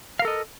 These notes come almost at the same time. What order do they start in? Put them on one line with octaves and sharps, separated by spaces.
F5 A#4 A4 D#5